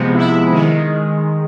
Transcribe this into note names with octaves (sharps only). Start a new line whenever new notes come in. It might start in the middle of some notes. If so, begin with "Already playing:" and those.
Already playing: C3 F3 G#3 B3
E4
D#3 G#3